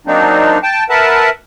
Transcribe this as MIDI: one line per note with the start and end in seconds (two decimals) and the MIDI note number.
0.07 0.58 54
0.07 0.58 58
0.07 0.58 60
0.07 0.58 62
0.07 0.58 63
0.63 0.84 79
0.63 0.84 81
0.89 1.30 70
0.89 1.30 71
0.89 1.30 76
0.89 1.30 78
0.89 1.30 81